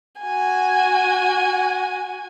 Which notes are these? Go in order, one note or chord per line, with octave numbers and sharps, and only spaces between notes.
F#4 G#5